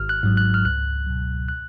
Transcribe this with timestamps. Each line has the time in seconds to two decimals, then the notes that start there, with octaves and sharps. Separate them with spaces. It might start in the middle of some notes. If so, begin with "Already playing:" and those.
Already playing: G#1 F6
0.09 F#6
0.23 G#2 F#3
0.37 F#6
0.54 F6
0.65 C#2 F#6
1.07 B2 F#3
1.49 F#6